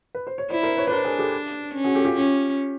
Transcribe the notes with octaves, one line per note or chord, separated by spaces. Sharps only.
B4
C5
C#5
E4 C5 D5
A#4 C5
B4 C#5
B4
D4 A#4 C5
G#4 A#4
G4 A4
C#4
F#4 G#4
G4 A4
F4 G4
C#4